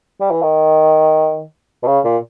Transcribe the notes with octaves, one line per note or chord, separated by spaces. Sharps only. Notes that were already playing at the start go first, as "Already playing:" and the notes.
G3
E3
D#3
B2
C#3
A#2